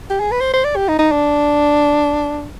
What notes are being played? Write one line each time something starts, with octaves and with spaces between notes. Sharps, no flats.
G4
G#4
B4
C5
C5
D5
G4
D#4
D#4
D4